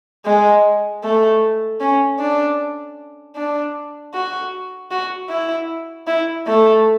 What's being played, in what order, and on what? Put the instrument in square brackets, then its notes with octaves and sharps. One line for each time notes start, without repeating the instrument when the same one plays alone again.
[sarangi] G#3
A3
C#4
D4
D4
F#4
F#4
E4
E4
A3